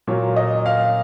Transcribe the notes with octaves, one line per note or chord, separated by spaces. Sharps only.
A#2 F#3 A#3 C#5
D#5
F5